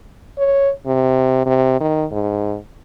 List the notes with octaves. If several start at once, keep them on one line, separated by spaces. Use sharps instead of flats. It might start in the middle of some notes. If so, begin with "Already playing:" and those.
C#5
C3
C3
D#3
G#2